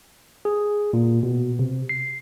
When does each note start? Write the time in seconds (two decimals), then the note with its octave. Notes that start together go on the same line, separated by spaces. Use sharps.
0.45 G#4
0.93 A#2
1.23 B2
1.59 C3
1.89 C7